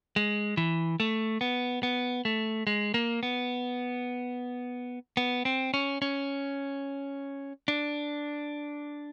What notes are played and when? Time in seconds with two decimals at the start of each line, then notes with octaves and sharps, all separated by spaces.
0.16 G#3
0.57 E3
1.00 A3
1.41 B3
1.83 B3
2.25 A3
2.67 G#3
2.94 A#3
3.23 B3
5.17 B3
5.45 C4
5.74 C#4
6.02 C#4
7.68 D4